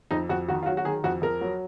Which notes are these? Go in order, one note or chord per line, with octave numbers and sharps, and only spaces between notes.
F2 D#4
F2 F#4
D#3 F#4
F4
F#3 F#4
F#4
D#3 G#4
F2 F#4
F2 A#4
F#3